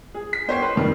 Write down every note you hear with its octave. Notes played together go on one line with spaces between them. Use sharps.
G#4
B6
B3 C5 C#5 G5 C7
B4
F2 C3 D#3 G3